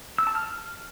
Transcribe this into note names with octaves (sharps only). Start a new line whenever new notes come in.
E6
A5
F6